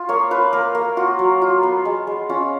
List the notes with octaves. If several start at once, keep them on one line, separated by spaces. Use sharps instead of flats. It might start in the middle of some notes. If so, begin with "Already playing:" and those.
Already playing: F4
A#3 C#5
F4 B4
A#3 A#4
A#3
F4 F#4
F#3
F4
B3
G#3
G#3
C#4 F4